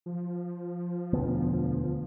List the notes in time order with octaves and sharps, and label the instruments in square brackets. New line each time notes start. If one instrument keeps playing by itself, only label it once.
[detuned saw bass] F3
[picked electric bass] E1 D2 B3